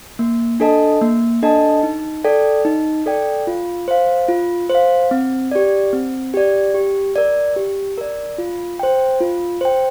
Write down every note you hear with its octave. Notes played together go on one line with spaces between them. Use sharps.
A#3
D4 A4 D#5 A5
A#3
D4 A4 D#5 A5
D#4
A4 D5 G5
D#4
A4 D5 G5
F4
C5 F5
F4
C5 F5
C4
G4 D5
C4
G4 D5
G4
A#4 D5
G4
A#4 D5
F4
C5 G5
F4
C5 G5